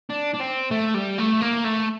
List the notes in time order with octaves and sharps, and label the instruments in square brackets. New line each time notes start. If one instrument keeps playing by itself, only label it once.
[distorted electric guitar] D4
D4
C4
A3
G3
A3
A#3
A3